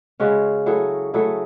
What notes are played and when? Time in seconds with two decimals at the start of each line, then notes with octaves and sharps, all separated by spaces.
0.20 C#3 G#3 C#4 F#4
0.66 F#3 A3 E4 G#4
1.14 F#3 A3 E4 G#4